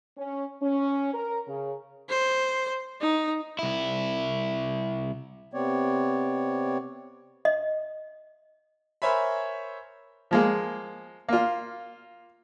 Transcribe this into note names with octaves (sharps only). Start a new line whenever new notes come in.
C#4
C#4
A#4
C#3
C5
D#4
C2 E4
C3 B3 C4 C#5 D5
D#5
A#4 C5 C#5 E5 G#5 B5
F3 G#3 A#3
A#3 F4